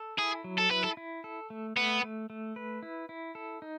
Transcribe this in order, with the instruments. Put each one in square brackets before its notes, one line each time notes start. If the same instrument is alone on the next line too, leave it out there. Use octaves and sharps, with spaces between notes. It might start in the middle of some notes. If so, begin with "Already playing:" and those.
Already playing: [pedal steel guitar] A4
[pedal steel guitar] E4 [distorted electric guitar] G#4
[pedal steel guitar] F#3
[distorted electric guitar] A4
[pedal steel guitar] E4 [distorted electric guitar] B4
[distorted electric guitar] A4
[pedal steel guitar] E4
A4
A3
[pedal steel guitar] A3 [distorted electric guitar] B3
[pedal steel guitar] A3
A3
B4
E4
E4
A4
D#4